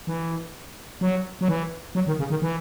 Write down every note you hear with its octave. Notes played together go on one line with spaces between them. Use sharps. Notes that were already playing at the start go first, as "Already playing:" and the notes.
E3
F#3
F#3
E3
F#3
D#3
C#3
D#3
E3